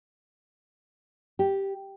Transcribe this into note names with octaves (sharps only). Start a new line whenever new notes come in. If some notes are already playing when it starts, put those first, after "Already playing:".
G4